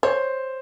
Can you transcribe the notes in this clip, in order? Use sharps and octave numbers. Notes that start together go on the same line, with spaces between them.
C5 C#5